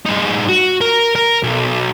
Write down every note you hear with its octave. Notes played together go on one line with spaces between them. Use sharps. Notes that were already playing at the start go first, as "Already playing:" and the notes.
G2 D#4
F#4
A#4
A#4
B1